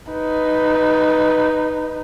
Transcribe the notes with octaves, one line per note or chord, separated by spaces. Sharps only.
D#4 B4